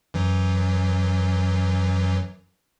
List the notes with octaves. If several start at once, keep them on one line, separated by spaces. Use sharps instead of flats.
F#2 E3 F#3